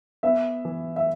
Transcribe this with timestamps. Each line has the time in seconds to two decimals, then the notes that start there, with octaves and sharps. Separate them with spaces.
0.23 B3 E5
0.65 E3
0.96 E5